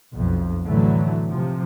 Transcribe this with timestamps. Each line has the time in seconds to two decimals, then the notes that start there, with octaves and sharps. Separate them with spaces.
0.13 B1 F2
0.65 A2 D3 E3 F#3 A3
1.28 C3 F3